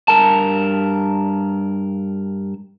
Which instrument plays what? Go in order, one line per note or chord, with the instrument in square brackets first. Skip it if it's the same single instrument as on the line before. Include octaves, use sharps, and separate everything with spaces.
[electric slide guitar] G2 A#4 A5